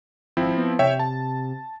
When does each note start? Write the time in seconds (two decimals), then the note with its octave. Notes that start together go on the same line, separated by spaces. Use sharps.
0.37 G#1 F3 C4 E4
0.57 B3
0.79 C3 C#5 E5 G5
0.99 A5